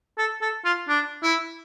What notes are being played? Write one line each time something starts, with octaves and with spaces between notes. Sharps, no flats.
A4
A4
F4
D4
E4